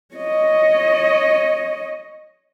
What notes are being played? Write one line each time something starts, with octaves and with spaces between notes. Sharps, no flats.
C#5 D#5